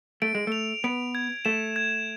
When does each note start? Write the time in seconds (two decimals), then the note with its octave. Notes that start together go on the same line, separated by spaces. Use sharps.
0.22 A3 D7
0.35 G#3
0.47 A3 F7
0.84 B3 D7
1.15 G#6
1.45 A3 E7
1.76 G#6